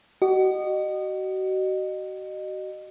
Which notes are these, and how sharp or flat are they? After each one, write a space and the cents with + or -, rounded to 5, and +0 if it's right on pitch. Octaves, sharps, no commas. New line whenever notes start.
F#4 +35 D#5 -25